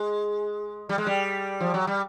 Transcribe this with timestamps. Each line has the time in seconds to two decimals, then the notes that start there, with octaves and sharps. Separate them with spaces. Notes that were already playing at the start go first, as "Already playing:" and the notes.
Already playing: G#3
0.89 G3
0.98 G#3
1.07 G3
1.61 F3
1.74 F#3
1.87 G3